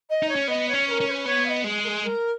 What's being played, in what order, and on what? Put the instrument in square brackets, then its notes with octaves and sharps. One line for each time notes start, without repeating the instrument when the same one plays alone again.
[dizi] D#5
[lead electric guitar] D#4
[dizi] C#5
[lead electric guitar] C#4
[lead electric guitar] B3 [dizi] D#5
[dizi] C#5
[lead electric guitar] C#4
[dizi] B4
A#4
[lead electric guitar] C#4
[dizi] C#5
B4
[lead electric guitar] B3 [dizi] C#5
[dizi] F5
D#5
[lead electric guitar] G#3 [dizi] G#4
[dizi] A#4
G#4
A#4